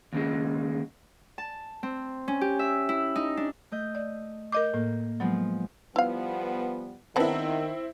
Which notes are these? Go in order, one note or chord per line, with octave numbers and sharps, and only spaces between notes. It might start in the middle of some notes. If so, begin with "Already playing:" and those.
D#2 C#3 G#3
A5
C4
C#4
G4
E5
E4
D#4
D4
A3 D#5 G6
D5
A#4 D#5 D6 G6
A2 A#3
F3 F#3 G#3 B3
F3 G3 B3 E4 F5
D#3 G#3 B3 C4 D4 E4